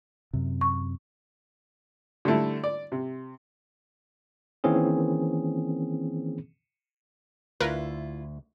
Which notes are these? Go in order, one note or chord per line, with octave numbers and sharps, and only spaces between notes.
F#2 C3
C#6
D3 G3 A3 E4
D5
C3
D#3 E3 A#3 C4 C#4 G#4
D2 E4 F4 A#4 B4